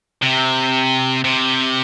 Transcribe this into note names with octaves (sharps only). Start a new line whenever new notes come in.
C3
C3